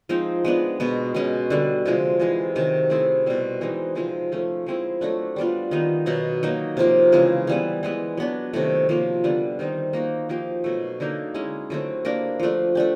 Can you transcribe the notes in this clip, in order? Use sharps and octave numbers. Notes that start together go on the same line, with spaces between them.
F3 G#3 C4 D#4
G#3 B3 D4
B2 G#3 B3
B2 G#3 C#4
D3 G3 B3
C3 F3 G#3
C3 E3 G#3
C3 D#3 F#3
A3 C4 E4 G#4
B2 G3 C4
E3 G#3 C4 D#4
C3 F3 G#3 C4
F3 A3 C#4
F3 G#3 C4 E4
F#3 A3 D4
G3 B3 D4 F4
D#3 G3 B3 D#4
B2 F#3 B3 D#4
F#3 A#3 D#4
C3 F3 A#3
C#3 E3 G#3 C4
E3 G3 B3
E3 G#3 B3
F#3 B3 D4
C3 D#3 F#3 A3
C3 F3 A#3
D3 G3 B3 D4
D#3 G3 C4 D#4
A#3 D#4 F#4
F3 A#3 D#4 G4
B2 F#3 A3
D3 F#3 A#3 D#4
G#3 C#4 E4
D3 F#3 A3 C4
A#3 D4 G4 A#4
F3 A3 D4
A3 D4 G4